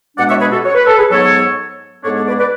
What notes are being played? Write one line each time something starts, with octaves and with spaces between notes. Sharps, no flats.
B2 G#3 D4 D5 F#5
C#5 E5
G#4 B4
F#4 A4
C#5
B4
A4
G#4 B4
G#2 F#3 B3 A4 C#5
G#2 G#3 B3 D4 A4 C#5
A4 C#5
B4 D5
B4 D5